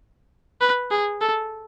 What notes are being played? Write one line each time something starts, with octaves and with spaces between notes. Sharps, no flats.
B4
G#4
A4